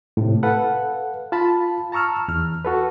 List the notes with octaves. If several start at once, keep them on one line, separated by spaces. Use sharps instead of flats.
A2 C3
A4 B4 F5 F#5
F4 A5 B5
A5 A#5 C#6 E6 F6
E2 F6
F#4 A4 B4